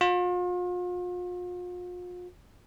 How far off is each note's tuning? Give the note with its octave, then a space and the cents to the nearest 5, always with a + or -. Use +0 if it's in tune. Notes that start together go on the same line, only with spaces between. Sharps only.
F4 +40